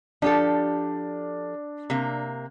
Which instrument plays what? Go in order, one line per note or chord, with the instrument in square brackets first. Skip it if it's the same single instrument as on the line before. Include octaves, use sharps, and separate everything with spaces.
[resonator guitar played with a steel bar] F3 G4 A4 [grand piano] D4
[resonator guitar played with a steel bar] C3 A#3